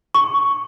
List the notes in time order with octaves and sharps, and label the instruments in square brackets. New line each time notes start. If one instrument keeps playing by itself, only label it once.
[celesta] C#6